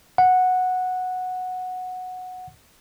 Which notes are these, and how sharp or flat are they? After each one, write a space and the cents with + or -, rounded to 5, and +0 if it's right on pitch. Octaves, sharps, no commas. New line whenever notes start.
F#5 -10